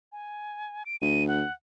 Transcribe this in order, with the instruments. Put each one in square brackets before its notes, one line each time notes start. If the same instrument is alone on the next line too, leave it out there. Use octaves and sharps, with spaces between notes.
[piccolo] G#5
D7
[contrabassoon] D2 [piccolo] D#7
[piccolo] F#5